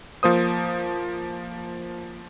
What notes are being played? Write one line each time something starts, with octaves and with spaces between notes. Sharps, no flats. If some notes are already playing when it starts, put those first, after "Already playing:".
F3 A#3 C5 D#6